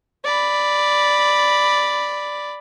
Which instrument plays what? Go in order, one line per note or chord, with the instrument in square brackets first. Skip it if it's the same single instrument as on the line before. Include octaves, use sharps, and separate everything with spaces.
[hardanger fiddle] D5 B5